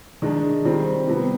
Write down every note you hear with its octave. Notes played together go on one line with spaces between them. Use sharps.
D#3 G#3 D4
D#3 G3 C4
C3 G3 B3